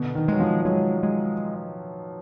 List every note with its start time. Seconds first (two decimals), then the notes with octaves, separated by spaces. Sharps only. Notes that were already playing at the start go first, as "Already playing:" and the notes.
Already playing: B2 D3
0.15 D#3
0.28 F#3 G#3
0.40 F3
0.65 F#3 G#3
1.03 G#3